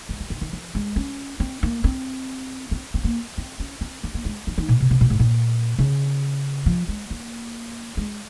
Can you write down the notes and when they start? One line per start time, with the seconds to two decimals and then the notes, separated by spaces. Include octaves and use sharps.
0.09 G#3
0.20 F3
0.30 D#3
0.41 D#3
0.53 F3
0.75 G#3
0.96 C#4
1.40 C4
1.63 A#3
1.84 C4
2.71 C4
2.94 C4
3.04 A#3
3.38 C4
3.60 C#4
3.81 C4
4.04 A#3
4.14 A#3
4.25 G#3
4.47 F3
4.58 D#3
4.69 A#2
4.80 C3
4.91 C3
5.01 A#2
5.10 G#2
5.20 A#2
5.79 C#3
6.66 F3
6.89 G#3
7.10 A#3
7.97 G#3